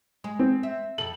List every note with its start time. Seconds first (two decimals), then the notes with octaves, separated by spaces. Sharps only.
0.24 G#3
0.39 C4
0.63 E5
0.98 F2 A4 F#7